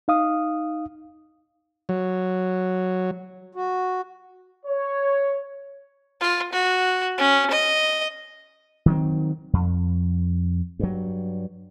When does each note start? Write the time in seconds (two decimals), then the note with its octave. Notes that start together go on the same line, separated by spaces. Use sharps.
0.08 D#4 F5 D#6
1.89 F#3
3.55 F#4
4.66 C#5
6.21 F4
6.52 F#4
7.18 C#4
7.51 D#5
8.86 D#3 F#3 C4
9.53 F2
10.79 G2 F#3